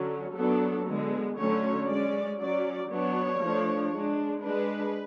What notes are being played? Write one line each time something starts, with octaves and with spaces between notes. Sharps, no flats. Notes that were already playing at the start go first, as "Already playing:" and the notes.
Already playing: D3 F#3 C#4
F#3 B3 D4 A4
D3 G#3 B3
D3 F#3 A3 C#4 C#5
G#3 C#4 D5
F#3 C#4 D5
F#3 B3 D4 C#5
F3 A3 D4
G#3 D4
G#3 D4 B4